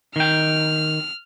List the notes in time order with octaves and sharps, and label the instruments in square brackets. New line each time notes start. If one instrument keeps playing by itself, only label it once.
[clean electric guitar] D#3 G5 [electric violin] F6